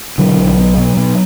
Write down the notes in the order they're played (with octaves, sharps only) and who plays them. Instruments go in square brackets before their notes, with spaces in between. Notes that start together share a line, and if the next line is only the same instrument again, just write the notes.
[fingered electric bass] B2 D3 F#3
B1
B2
B2
B2